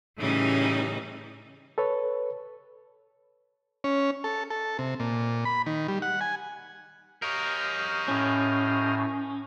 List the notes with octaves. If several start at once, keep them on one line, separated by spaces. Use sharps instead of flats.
A2 C#3 E3 G3 C#4 D#4
A4 B4 C#5
C#4
A4
A4
C3
A#2
B5
D#3
G3
F#5
G#5
G4 A#4 C#5 D#5 F5
A2 C#4